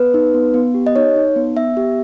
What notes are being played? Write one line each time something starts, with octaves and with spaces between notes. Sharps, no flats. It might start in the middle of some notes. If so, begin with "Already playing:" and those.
Already playing: B3 B4
D#4
B3
B3
G4
D#5
D#4 C#5
D#4
B3
B3 E5
G4